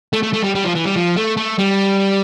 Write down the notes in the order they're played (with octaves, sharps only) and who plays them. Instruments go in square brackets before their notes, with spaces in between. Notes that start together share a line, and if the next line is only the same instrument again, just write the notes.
[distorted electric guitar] A3
A3
A3
G3
G3
F3
E3
G3
F3
A3
A3
G3